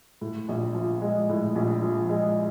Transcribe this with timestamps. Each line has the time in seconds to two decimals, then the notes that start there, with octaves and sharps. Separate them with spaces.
0.21 A2
0.48 A#1
0.75 F3
1.02 G#3
1.29 A2
1.55 A#1
1.82 F3
2.09 G#3